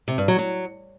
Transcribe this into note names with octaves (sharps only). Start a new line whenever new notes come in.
C3
G2
F#3
F#3